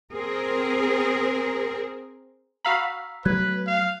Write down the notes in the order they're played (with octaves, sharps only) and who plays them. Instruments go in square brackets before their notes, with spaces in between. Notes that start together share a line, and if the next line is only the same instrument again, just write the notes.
[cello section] C4 G#4 A#4
[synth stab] F#4 F5 B5 [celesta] A#5 E6 B6
[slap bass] F#3 A3 B3 [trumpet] B4 [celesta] F#6 G#6
[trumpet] F5